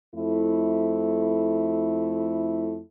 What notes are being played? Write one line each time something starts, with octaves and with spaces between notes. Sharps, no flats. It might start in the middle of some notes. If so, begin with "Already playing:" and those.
F2 A3 E4